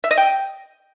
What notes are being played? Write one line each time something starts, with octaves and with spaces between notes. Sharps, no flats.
E5
D#5
G5